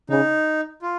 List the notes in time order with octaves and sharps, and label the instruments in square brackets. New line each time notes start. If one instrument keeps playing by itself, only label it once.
[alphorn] C#3 [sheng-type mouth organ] D#4
[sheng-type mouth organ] F4